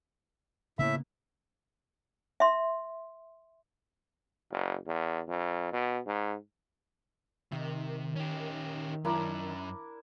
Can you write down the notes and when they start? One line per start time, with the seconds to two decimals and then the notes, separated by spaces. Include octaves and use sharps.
0.79 A2 C#3 A#3 B3 E5
2.40 E5 C6
4.50 F#1
4.87 E2
5.28 F2
5.73 B2
6.07 G#2
7.52 C3 D#3 E5
8.16 C#4 G4
9.05 F#2 C#4 D4 E4 A#4